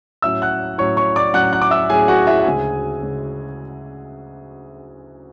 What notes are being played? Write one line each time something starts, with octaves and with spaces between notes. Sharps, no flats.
A2 F#3 C#4 E5 E6
F#5 F#6
A2 F#3 C#4 C#5 C#6
C#5 C#6
D5 D6
A2 F#3 C#4 F#5 F#6
F#5 F#6
D6
E5 E6
A2 F#3 C#4 G#4 G#5
F#4 F#5
E4 E5
F#5
D2 C#3 G#3 G#4 G#5
C#3 G#3